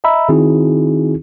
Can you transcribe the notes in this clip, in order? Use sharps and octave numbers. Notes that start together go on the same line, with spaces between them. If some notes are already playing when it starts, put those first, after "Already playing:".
D#5 E5 A#5 B5 E6
D#3 C4 D#4 E4 F#4 G#4